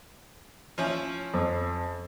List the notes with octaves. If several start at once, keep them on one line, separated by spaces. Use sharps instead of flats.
F3 C#4 E4
F2